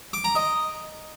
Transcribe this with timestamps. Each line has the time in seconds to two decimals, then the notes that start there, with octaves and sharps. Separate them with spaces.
0.13 D6
0.24 A#5
0.35 D#5